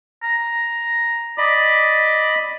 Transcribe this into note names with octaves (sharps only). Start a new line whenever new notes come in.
A#5
D5 D#5 B5